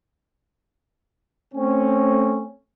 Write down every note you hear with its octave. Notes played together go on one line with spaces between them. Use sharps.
A3 C4 C#4